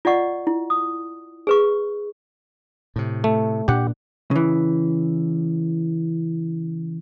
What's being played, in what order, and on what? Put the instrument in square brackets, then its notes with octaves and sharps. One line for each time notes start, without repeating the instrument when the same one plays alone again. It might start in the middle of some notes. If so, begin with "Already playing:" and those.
[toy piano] F4 D5 D#5 F#5 C#6
E4
D#6
G#4 B4 C#6
[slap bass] A2 C3
[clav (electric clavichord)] A3
[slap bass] A#2 D4 [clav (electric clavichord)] G4 F#5
[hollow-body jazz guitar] C#3 E3